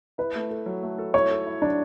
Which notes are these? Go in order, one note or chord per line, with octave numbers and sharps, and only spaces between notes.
E4 B4
A3
A4
F#3
A3
A4
E4 C#5
A4
E4
F#3 D4